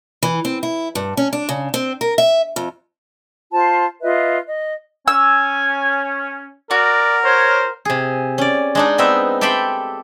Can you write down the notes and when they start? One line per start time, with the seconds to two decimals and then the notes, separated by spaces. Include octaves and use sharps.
0.23 E3
0.45 C4
0.63 E4
0.95 G2
1.17 C#4
1.33 D4
1.49 C#3
1.74 C4
2.01 A#4
2.18 E5
2.56 F2
3.52 F4 C5 A5
4.02 F4 B4 D#5 E5
4.47 D#5
5.08 C#4 G#5 E6
6.71 F#4 A#4 D5
7.24 C5 C#5
7.85 C3 G#4
8.38 C#4 D5
8.75 G#3 D4 D#4
8.98 B3 C4 D#4 E5
9.41 G4 A4 E5 G5 B5 C6